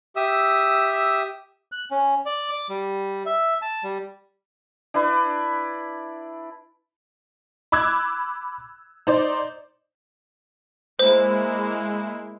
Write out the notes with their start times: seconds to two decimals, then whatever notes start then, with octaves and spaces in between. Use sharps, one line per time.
0.16 G4 E5 D#6 E6
1.72 F#6
1.91 C#4
2.26 D5
2.50 D6
2.69 G3
3.26 E5
3.62 A5
3.84 G3
4.94 D4 E4 B4
7.72 B5 D6 E6 F#6 G#6
9.07 D#4 C5 D5
10.99 G#3 A#3 E4 C5